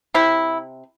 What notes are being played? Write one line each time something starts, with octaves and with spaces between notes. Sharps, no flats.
C3 E4